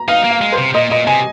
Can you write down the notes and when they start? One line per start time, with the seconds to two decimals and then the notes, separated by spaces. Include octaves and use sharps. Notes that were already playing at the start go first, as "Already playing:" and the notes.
Already playing: A#5
0.08 D#4 F5
0.24 A#3
0.31 F5
0.41 G#3
0.52 C5
0.58 C3
0.74 A#2 D#5
0.91 A#2 D#5
1.07 C3 G#5